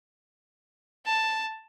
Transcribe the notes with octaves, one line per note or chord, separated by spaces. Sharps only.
A5